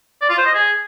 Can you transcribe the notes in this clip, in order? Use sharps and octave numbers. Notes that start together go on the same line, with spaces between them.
D5
F4
C5
D#5
G#4